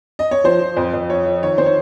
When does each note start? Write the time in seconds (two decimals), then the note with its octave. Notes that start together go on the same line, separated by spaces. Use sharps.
0.19 D#5
0.31 C#5
0.44 F3 C5
0.61 F3
0.77 F2
0.94 F2
1.09 F3 C#5
1.26 F3
1.43 D#3 C#5
1.58 D#3 C5
1.66 C#5